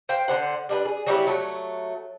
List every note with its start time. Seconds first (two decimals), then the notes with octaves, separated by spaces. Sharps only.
0.09 C5 F5 G5
0.28 D3 C5 F#5
0.69 G3 D4 B4
0.85 G#4
1.06 F#3 G3 B3 E4
1.27 F#3 A3